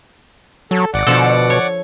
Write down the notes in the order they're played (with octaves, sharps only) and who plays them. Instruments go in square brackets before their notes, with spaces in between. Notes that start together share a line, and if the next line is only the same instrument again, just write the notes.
[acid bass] F#3 [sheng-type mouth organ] A4
[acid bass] G#1 [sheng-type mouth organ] D5 F#5
[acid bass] B2 [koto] D3 F3 A4
[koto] C#5